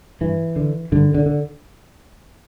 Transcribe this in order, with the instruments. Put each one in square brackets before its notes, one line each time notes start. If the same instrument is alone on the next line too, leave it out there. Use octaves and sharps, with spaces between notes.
[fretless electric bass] G2 E3
D3
G2 D3
D3
D3